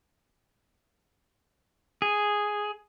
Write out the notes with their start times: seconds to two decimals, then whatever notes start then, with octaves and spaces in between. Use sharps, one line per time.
2.02 G#4